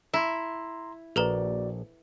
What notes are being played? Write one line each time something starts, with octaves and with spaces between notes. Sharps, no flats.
E4 A#5 C6
A#1 F#4 A4 B4 D5 A#5